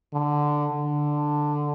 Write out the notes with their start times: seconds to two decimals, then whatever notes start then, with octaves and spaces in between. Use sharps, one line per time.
0.14 D3
0.73 D3